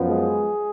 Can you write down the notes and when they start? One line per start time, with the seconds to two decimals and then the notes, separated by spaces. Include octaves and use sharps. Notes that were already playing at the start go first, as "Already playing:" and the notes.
Already playing: F#2 F3 B3
0.08 G#3 G#4